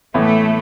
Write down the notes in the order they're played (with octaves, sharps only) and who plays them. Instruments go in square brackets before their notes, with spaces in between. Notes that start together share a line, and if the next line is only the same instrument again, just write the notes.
[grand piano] A2 E3 B3 [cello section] A3